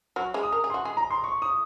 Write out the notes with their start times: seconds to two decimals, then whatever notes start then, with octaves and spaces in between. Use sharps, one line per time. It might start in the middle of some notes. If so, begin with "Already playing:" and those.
0.16 F#3 F#4 F6
0.34 G#3 G#4
0.43 D#6
0.52 A#4
0.64 G#4
0.70 F#4 C6
0.85 G#3 G#4
0.97 A#5
1.11 C6
1.24 C#6
1.42 D#6